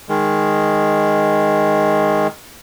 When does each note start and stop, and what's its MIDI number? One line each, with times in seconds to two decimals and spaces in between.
0.09 2.27 51
0.09 2.27 56